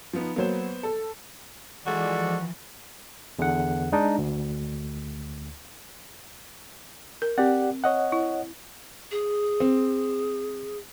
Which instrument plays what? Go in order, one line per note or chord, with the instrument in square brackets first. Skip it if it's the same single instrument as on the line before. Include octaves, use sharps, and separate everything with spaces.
[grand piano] F3 B3 D#4
[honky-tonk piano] F#3 A#3 [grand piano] B3 C5
[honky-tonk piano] A4
[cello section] E3 F3 [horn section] G#3 A4 D5 [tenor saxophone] F#4
[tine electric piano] E2 D3 F#5
G#3 D4 D#4 D5
D2
[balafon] A#4
[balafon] C4 [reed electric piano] G4 D5 F#5
[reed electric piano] C#5 D#5 F#5
[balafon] E4
[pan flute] G#4
[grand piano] C4